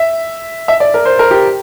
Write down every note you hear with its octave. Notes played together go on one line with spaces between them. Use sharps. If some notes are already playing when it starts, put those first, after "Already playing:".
Already playing: E5
E5
D5
A#4
C5
A#4
G4